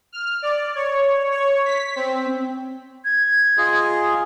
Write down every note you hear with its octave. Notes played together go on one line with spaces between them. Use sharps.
F6
D5
C#5
C#5
B6
C4
G#6
F4 G#4 D#5